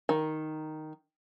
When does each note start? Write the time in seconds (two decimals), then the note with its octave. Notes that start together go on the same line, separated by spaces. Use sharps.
0.09 D#3